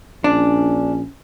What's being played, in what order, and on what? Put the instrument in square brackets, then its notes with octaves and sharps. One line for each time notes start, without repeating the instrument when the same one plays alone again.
[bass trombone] A#1 [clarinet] C#4 [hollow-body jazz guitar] D4